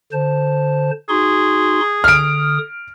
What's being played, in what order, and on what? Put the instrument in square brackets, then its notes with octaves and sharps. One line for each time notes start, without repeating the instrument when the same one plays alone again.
[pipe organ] D3 C5 A5
[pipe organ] D#4 F#4 C6 [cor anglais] G#4
[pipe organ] D3 D#6 [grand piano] F6 D7